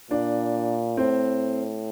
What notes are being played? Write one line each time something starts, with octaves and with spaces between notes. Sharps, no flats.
A#2 D4
A2 C4